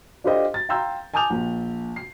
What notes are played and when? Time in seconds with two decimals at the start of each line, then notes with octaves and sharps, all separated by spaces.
0.24 D4 F4 G4 A4 C5 D#5
0.54 A6
0.69 F5 G5 A#5 C6 E6 G6
1.14 G#5 A5 D6 D#6 G6 F7
1.30 A#1
1.96 C7